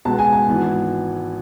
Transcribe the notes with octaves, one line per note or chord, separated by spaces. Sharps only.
C#2 B2 G#3 B3 A5
G#5
A5
G#1 G#2 E3 B3